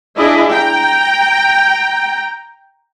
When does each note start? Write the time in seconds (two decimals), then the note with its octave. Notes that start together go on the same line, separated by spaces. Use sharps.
0.16 D4 E4 G#4 D#5
0.50 G5 A#5